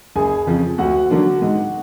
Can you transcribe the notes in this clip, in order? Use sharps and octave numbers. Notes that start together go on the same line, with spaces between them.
F#1 G#4 G#5
F2 C#3 F3
D2 F#4 F#5
D3 F#3 A#3 D4
G#2